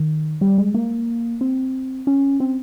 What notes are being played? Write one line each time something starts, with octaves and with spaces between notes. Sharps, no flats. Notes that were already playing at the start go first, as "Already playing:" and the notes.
Already playing: D#3
G3
G#3
A#3
C4
C#4
C4